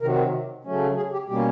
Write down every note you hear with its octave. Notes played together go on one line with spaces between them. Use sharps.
C3 D#3 F#3 A#4
C#3 F#3 A3 C#4
G#4
G4
B2 G3 A#3 C#4 G4